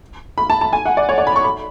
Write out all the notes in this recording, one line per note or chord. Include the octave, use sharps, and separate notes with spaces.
B5
A5
A5
G#5
F#5
D5
C#5
D5
B5
C#6
B5